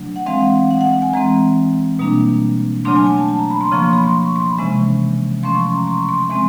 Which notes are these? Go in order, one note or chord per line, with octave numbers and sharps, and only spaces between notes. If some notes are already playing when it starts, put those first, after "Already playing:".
Already playing: C#3 F#3 A3 D4
F#5
E3 G#3 C4 F5
F#5
F5
F#5
F#5
F#5
G#5
E3 G#3 C4 A#5
B2 G3 A#3 D4
C#3 F#3 A3 D4 C6
G#5
G#5
A5
A5
A#5
B5
C6
C#3 F3 A#3 C#6
C6
B5
C6
C6
C#6
C6
B5
C3 E3 G#3 C#4
F3 A3 C#4 C6
C#6
C6
A#5
C6
C#6
C6
E3 G#3 C4 C6